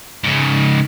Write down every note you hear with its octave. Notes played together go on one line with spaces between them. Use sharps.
G#2 C#3